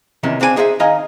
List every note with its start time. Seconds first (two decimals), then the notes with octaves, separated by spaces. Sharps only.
0.23 E2 C3 D#3 E3 C#4
0.40 C#2 C4 D4 E4 G#5
0.56 D#4 G#4 C5 D#5 E5
0.80 D#3 D#4 D#5 F5 G#5 A#5